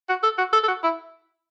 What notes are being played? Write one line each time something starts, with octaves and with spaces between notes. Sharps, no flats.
F#4
A4
F#4
A4
A4
F#4
E4